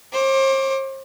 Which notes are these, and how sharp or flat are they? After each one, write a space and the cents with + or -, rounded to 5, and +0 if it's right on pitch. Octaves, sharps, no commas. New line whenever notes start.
C5 +40 D6 +0